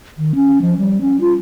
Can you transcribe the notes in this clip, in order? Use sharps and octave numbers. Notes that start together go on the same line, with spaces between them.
D#3
C#4
F3
G3
C#4
F4